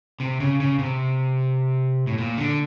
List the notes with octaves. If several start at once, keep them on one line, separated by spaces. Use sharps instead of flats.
C3
C#3
C#3
C3
A2
A#2
D3